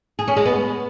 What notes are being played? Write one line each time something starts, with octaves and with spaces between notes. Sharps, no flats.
G#4
C#4
G#3
B3